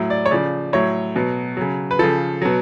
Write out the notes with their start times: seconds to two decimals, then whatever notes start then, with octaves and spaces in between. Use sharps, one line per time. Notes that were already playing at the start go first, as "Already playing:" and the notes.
Already playing: A2 F#3
0.10 D5
0.26 C#5
0.31 C#3 F3 D5
0.73 A2 F#3 C#5
1.16 B2 F#3
1.57 C#3 F#3
1.91 B4
1.99 C#3 F3 A4
2.42 B2 F#3